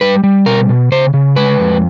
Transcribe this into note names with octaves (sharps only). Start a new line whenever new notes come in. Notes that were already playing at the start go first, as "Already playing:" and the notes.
G3 B4
G3
B2 A#4
B2
C#3 C5
C#3
G#3 B4
F2